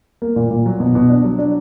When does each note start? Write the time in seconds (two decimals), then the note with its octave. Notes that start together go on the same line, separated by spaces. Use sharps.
0.22 A#3
0.36 A#2
0.51 A#2
0.66 F#3
0.80 B2
0.95 B2
1.10 D4
1.24 F#3
1.39 D4